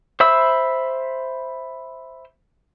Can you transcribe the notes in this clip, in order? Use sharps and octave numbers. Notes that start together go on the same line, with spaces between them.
C5 E5 B5 E6